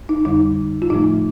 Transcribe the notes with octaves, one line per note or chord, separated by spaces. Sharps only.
D#4
F2 D3 G3 D#4
F4
A2 F3 A3 D#4